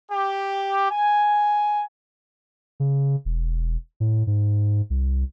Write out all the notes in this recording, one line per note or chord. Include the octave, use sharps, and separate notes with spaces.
G4
G#5
C#3
E1
A2
G#2
C2